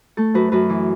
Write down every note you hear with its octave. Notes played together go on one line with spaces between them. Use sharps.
A3 A4
F#2 F#4 B4
F#2 F#4 B4
E3